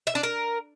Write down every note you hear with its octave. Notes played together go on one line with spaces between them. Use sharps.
E5
D4
A#4